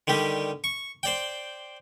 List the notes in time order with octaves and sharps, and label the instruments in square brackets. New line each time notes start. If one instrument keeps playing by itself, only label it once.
[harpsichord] D3 D#3 G3 G4
C#6
C5 D5 G5